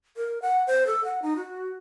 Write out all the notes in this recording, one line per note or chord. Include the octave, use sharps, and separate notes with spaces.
A#4
F#5
C5
A4
F#5
D#4
F#4